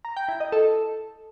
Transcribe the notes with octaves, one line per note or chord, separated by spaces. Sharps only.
A#5
G5
E4
D#5
A4